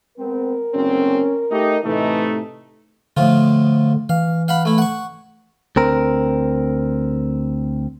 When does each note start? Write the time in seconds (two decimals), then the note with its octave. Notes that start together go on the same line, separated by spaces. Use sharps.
0.18 G#3 B3 C4 A#4
0.74 F#1 D2 C4 C#4
1.51 A3 D#4 G4
1.84 A2 C3 E3 A3 D#4
3.17 A2 D3 F3 F4
4.09 E3 F5
4.48 F5 F#5 B5
4.65 A3 E4
4.78 F#5 C#6
5.76 D2 C4 A#4